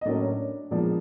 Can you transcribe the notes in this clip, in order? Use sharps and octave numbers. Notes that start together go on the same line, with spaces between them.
D#5
A2 F#3 A#3 C#4 D4 D5
A#2 F3 G#3 B3 D4 D5